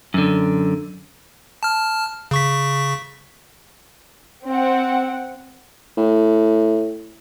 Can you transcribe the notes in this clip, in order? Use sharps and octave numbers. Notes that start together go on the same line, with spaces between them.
F#2 D3
A5 F6
C#3 C#6 B6
C4 F#5
A2